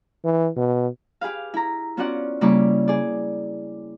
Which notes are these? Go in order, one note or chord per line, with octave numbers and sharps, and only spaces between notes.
E3
B2
G4 G#4 B4 F5
E4 A#5
B3 C#4 F4 F#4 D5 F#5
C#3 G3 A#3 E4 D5 C#6
G#4 D5